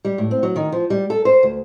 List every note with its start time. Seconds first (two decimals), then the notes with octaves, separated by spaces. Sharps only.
0.05 G3
0.18 A2
0.31 C4
0.43 F#3
0.56 D#3
0.72 F3
0.90 G3
1.10 A4
1.25 C5
1.43 D2